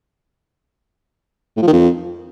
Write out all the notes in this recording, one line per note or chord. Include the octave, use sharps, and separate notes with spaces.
A2
F3
D#3
F2